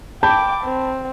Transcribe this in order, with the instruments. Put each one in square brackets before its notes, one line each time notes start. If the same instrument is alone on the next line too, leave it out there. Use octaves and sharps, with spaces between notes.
[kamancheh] G5 D6 [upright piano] A5 B5 G6
[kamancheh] C4